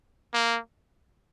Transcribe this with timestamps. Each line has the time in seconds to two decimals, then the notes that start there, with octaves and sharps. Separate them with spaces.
0.33 A#3